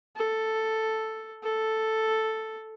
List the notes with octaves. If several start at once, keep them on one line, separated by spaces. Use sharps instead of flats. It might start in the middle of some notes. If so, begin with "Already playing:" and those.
A4
A4